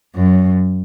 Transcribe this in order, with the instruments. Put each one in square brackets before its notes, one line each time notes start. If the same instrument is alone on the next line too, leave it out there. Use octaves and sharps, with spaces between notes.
[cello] F#2